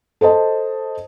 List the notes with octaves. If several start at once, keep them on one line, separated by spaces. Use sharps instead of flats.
A4 C5 D#5 A5